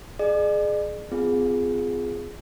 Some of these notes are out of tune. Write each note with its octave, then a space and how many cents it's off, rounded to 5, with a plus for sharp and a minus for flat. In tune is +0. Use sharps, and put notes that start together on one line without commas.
G#4 +20 D5 +45
C4 -45 F4 -5 G#4 +0